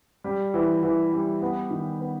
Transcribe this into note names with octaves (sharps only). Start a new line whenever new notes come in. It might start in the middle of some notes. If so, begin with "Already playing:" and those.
G3
E3
E3
G3
B3
D#3
B3